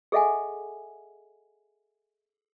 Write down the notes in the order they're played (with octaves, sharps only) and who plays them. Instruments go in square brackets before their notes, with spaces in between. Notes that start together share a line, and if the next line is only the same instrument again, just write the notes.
[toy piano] G#4 A4 D#5 E5 F#5 G#5